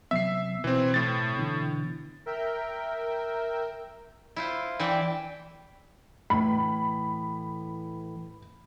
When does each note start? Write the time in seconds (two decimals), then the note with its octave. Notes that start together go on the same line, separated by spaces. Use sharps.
0.11 C3 F#3 B3 E5 C7
0.64 B2 E3 C4
0.94 A2 A6
1.37 B2 D3 E3
2.26 A#4 E5 G5
4.36 E4 F4 C5
4.80 E3 D5 E5 G5 A5
6.30 A2 E3 B5